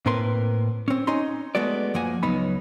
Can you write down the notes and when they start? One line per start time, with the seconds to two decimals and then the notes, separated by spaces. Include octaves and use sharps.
0.06 A2 A#3 C4 A#4 B4 C6
0.88 C4 C#4
1.07 C#4 D#4 D#5 A#5 C6
1.55 G#3 A3 B3 F#4 D5
1.94 F#2 F3 A#3 F#5 G#5
2.23 C#2 F#3 B3 D#4 B5